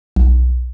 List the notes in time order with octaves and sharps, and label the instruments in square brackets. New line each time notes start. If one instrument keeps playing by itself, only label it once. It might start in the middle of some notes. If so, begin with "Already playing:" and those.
[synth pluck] B1